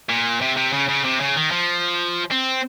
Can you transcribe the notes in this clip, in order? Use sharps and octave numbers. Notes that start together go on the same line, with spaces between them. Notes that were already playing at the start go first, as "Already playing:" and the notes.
A#2
C3
C3
C#3
C#3
C3
C#3
D#3
F3
C4